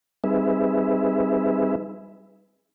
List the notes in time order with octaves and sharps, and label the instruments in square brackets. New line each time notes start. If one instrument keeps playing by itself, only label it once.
[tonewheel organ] G3 C4 D#4 G#4 B4 E5